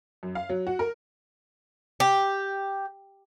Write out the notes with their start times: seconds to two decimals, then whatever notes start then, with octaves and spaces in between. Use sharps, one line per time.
0.23 F#2
0.35 F5
0.50 F#3
0.67 F#4
0.79 A#4
2.00 G4